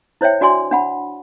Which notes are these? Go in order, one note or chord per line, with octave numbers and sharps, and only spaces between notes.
E4 C5 C#5 E5 G5
D4 F#4 D5 G#5 C6
D4 F#5 B5